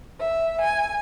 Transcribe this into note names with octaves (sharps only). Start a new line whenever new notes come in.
E5
G#5